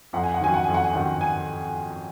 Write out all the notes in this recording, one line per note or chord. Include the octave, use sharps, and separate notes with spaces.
F2 F#5
G#5
F#5
D#3 F#3 C#4 G#5
F#5
F2 G#5
F#5
G#5
D#3 F#3 C#4 F#5
G#5